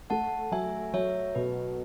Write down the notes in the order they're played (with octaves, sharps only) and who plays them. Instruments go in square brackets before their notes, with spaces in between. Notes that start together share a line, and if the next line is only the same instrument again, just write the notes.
[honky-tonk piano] A3 [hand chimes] F#5 A5
[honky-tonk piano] F#3 [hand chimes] E5 G#5
[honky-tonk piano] F#3 [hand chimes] C#5 E5
[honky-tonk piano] B2 [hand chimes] B4